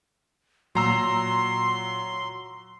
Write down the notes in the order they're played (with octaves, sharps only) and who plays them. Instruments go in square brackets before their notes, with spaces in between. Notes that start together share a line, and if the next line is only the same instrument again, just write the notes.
[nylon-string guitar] A#2 [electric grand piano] F#3 A#5 E6 [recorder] C6